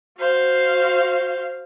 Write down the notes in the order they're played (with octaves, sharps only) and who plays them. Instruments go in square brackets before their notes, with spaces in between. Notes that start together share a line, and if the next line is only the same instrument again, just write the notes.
[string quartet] F#4 C5 F5